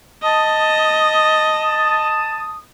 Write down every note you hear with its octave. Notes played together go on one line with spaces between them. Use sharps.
D#5 A5 D#6